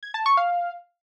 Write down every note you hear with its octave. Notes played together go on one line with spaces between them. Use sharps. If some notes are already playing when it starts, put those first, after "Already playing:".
G#6
A5
C#6
F5